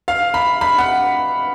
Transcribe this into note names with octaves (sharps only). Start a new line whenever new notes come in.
F5
B5
B5
F#5